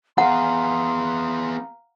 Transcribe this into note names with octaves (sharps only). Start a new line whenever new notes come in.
B3 G#4 F5 F#5 A#5 C6